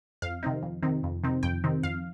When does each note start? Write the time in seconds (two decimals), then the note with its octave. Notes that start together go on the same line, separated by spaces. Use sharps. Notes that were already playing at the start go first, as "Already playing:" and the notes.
0.22 F2 F5
0.43 C3 D#3 C4 D#4
0.62 F2
0.82 C3 D#3 C4 D#4
1.03 F2
1.24 C3 D#3 C4 D#4
1.43 F2 G5
1.64 C3 D#3 C4 D#4
1.83 F2 F5